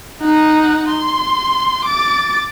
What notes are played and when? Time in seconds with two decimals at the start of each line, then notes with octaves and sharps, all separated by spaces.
0.21 D#4 F#5
0.89 C6
1.85 D6 A6